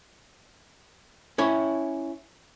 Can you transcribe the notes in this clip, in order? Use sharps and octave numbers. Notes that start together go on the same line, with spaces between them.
C#4 E4 C#5